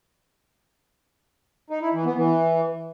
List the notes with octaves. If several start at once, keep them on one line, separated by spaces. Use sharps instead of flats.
D#4
E4
E3
B3
E3